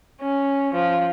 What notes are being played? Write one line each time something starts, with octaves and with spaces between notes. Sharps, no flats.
C#4
F3